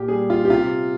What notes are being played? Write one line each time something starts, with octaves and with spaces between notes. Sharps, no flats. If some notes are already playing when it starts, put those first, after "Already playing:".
Already playing: A#2 G4
G3 G#4
F4
G4
C3 F4